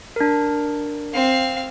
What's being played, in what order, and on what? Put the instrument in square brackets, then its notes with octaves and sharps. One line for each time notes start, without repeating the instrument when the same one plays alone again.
[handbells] D4 A#4
[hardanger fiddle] C4 F5